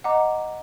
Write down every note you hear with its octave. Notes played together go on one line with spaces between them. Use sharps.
D#5 F#5 A#5 D6